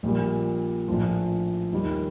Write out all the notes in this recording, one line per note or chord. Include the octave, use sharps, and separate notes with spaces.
A#1 A#2 G3
A#1 A2 F3
D#2 D#3 G3